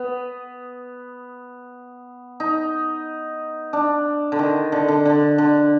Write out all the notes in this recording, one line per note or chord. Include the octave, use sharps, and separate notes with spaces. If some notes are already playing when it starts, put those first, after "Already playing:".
Already playing: B3
D#4
D4
D3
D#3
D3
D3
D3
D3